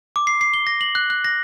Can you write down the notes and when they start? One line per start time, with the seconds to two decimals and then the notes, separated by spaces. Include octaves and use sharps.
0.16 D6
0.27 C7
0.41 C7
0.54 G7
0.67 A#6
0.81 F#7
0.95 F#6
1.10 F#6
1.24 A#6